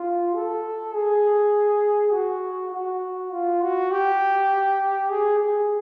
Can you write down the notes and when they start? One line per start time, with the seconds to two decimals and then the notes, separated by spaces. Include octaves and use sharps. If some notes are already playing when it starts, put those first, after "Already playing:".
Already playing: F4
0.34 A4
0.94 G#4
2.12 F#4
2.72 F#4
3.32 F4
3.62 F#4
3.91 G4
5.10 G#4
5.40 G#4